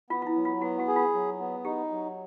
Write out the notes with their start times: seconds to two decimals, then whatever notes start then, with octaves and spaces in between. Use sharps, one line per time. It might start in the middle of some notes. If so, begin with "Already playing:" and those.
0.10 B3 F4
0.22 F4
0.27 E4
0.35 F#3
0.45 F4
0.61 B3 F#4
0.79 F#4
0.88 G#4
0.96 F4
1.14 F#3
1.40 B3
1.65 D#4 G4
1.91 F#3